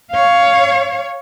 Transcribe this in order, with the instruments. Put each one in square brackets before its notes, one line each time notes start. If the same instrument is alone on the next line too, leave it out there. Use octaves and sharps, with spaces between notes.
[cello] C#5 F5